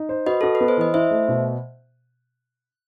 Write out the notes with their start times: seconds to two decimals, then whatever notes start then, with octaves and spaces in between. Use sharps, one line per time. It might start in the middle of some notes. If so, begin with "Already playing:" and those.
Already playing: D#4
0.09 C5
0.26 F#4 B4 D#5
0.41 F#4 A4
0.55 B4
0.61 B3
0.68 C5
0.77 E3 D#5
0.94 E4 C5 E5
1.11 A3
1.28 B2